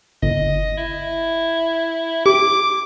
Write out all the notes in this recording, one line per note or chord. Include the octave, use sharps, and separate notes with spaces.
G1 D#5
E4
G4 D6